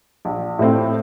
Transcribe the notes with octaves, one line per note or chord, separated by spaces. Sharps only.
A#1
A2 A3 C4